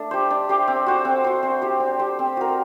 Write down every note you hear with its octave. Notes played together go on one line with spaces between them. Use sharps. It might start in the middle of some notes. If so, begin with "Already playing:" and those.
Already playing: A3 D4
G4 C5
D4
G4 C5
C4
F#4 C5
C4
F#4 C5
C4
G4 C5
C4
G4 C5
C4
F#4 A#4